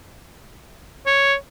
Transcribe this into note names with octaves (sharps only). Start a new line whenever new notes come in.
C#5